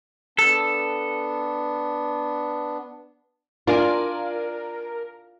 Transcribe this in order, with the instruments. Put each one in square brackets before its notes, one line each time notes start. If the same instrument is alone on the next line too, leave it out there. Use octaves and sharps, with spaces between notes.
[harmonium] B3 D4 [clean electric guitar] A4
[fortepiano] D4 D5 G#5 [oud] F4 [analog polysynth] A#4